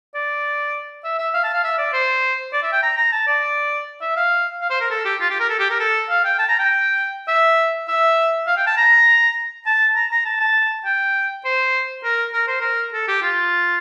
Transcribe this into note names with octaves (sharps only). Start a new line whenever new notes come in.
D5
E5
E5
F5
A5
F5
E5
D5
C5
D5
E5
G5
A#5
A#5
A5
D5
E5
F5
F5
C5
A#4
A4
G4
F4
G4
A#4
A4
G4
A#4
A4
F5
G5
A5
A#5
G5
E5
E5
F5
G5
A5
A#5
A5
A#5
A#5
A5
A5
G5
C5
A#4
A#4
C5
A#4
A4
G4
F4